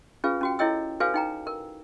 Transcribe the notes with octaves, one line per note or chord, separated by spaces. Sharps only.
C#4 F4 G#4 B4 F5
C#4 F#4 G5
E4 A4 C#5 D#5 G5 E6
F#4 A4 B4 C#5 F5 G#5
D#4 G5 A#5
A#4